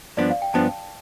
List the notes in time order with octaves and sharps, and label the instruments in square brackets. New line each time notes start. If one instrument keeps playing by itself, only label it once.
[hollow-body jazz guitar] G2 F3 B3 D4 [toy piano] D5
[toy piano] F5
G5
[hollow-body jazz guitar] G2 F3 B3 D4 [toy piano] A5